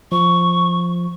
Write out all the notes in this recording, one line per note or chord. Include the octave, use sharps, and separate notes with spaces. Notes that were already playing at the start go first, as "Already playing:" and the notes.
F3 C#6